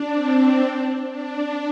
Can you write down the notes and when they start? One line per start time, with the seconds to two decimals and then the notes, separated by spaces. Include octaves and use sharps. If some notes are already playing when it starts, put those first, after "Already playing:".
Already playing: D4
0.13 C4
1.11 D4